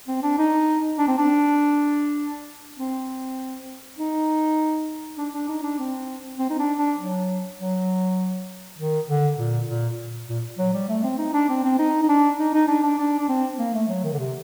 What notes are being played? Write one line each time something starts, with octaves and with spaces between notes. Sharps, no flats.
C4
D4
D#4
D4
C4
D4
C4
D#4
D4
D4
D#4
D4
C4
C4
D#4
D4
D4
F#3
F#3
D#3
D3
A#2
A#2
A#2
F#3
G3
A3
C4
D#4
D4
C4
C4
D#4
D#4
D4
D#4
D#4
D4
D4
D4
D4
C4
A#3
A3
F#3
D#3
D3
C3